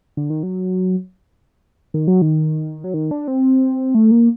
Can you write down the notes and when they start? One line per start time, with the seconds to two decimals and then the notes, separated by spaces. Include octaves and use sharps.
0.17 D3
0.30 D#3
0.43 F#3
1.94 D#3
2.08 F#3
2.22 D#3
2.84 F#3
2.94 D#3
3.11 D4
3.28 C4
3.95 A3
4.11 A#3